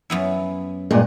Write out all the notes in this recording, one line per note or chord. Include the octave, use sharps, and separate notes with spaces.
F#2 B3 E4
G2 A#2 G#3